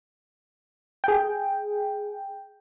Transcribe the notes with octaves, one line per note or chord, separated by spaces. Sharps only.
G#4 G5